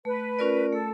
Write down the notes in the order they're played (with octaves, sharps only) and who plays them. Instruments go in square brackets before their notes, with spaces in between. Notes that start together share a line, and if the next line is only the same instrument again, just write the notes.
[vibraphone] A3 [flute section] B4
[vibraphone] C#4 F4 A#4 D5
[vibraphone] A3 [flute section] A4